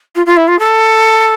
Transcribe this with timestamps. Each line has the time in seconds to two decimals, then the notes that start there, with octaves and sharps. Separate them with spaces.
0.15 F4
0.26 F4
0.37 E4
0.47 F4
0.59 A4